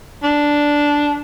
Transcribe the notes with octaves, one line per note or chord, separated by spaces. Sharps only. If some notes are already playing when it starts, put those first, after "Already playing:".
D4